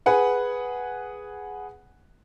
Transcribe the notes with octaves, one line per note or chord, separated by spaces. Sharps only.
G#4 B4 F#5 G#5